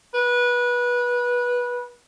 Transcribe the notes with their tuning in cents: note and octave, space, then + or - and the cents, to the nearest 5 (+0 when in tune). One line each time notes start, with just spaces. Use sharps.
B4 -20